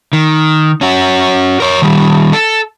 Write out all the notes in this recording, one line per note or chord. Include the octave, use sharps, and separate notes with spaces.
D#3
C#4 F#4
A#4 C#5
D#3 G3
A4